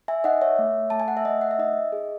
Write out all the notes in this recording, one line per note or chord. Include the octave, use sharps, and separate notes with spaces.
E5 G#5
D#4 D#5 F#5
C#5 E5
A3
A3 A5
G#5
F#5
E5
A3 D#5
F#5
E5
D#4 D#5
G#4